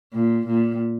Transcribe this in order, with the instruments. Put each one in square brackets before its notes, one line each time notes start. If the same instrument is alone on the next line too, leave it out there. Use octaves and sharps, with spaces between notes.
[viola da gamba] A#2
A#2